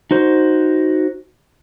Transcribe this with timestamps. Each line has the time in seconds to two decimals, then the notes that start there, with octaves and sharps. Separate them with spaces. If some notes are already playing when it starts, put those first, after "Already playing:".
0.11 D#4 F#4 C5